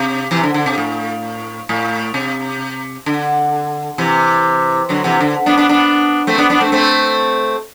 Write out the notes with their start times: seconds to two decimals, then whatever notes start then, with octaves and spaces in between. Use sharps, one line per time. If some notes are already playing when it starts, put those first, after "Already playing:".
Already playing: C3
0.31 C3 E3
0.43 D3
0.54 D3
0.66 C3
0.78 A2
1.69 A2
2.14 C3
3.06 D3
3.98 C3 E3
4.89 D3 F#3
5.04 C3 E3
5.20 D3
5.46 B3 D4
5.57 B3 D4
5.69 B3 D4
6.27 A3 C4
6.38 B3 D4
6.50 B3 D4
6.61 A3 C4
6.72 A3 C4